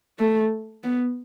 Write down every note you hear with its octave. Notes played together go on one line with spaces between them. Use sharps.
A3
B3